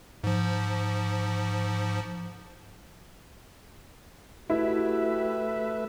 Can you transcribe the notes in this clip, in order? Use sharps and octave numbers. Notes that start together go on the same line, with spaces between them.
G#2 F3
A3 E4 F#4 G4 B4 E5